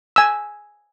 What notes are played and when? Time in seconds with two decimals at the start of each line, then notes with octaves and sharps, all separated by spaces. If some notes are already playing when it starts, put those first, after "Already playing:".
0.16 G#5 E6